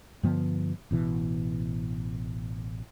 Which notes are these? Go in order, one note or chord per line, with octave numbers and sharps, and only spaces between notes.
G2 D3 F3 B3
A1 B2 E3